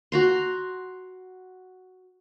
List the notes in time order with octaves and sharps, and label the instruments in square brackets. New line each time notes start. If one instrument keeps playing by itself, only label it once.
[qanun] F#4 A#5 C6